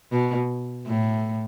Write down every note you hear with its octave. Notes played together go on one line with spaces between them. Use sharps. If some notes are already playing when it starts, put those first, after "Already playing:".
B2
A2